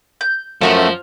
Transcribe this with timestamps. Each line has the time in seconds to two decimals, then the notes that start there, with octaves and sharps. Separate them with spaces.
0.21 G6
0.61 F#2 F3 A3 C#4 F#4 D#5